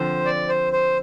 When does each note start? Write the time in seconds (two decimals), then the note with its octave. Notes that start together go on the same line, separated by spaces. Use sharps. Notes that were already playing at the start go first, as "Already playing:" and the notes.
Already playing: D3 F3 C4 C5
0.26 D5
0.49 C5
0.73 C5